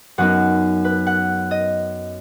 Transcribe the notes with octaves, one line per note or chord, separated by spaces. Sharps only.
F#2 F#3 B3 D#4 F#5
B4
F#5
D#5